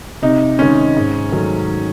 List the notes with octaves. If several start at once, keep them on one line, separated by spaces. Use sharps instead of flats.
C3 D#4
D#3 G#3 C#4
G#2
D#3 F#3 A3